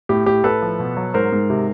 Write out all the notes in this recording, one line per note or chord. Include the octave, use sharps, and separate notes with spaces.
A2 G4
A2 G4
A2 A4 B4
F3
B2
F#3
G#2 A#4 C5
G#2
C3